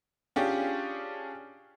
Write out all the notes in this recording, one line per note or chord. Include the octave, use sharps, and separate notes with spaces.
C#4 D4 F4 G4 G#4